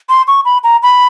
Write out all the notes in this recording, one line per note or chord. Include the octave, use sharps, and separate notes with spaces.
C6
C#6
B5
A#5
B5